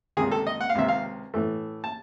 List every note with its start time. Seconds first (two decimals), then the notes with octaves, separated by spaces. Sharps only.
0.17 C#2 C3 D#3 G#4
0.32 A4
0.47 D#5
0.61 F#5
0.70 F5
0.75 C#2 C3 D#3 E5
0.88 F5
1.34 A2 E3 A3
1.84 A5